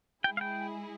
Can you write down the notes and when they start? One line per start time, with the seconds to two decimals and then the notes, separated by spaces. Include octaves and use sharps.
0.24 G#3 E4 G#4 G5
0.37 F5
0.41 G5